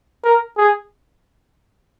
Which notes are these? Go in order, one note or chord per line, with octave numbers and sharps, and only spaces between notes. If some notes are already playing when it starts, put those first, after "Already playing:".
A#4
G#4